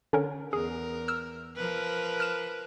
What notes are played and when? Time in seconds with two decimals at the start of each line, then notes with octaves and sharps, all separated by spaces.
0.13 D3 C#4 A#4
0.53 E2 G#4 A#4
1.08 E6 F6
1.56 F3 A#4 B4
2.20 F6 E7